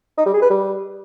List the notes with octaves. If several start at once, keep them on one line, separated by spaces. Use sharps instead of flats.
D#4
G3
G#4
B4
G3